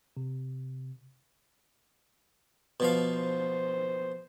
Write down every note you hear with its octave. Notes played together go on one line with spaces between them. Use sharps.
C3
B2 F3 F5
C5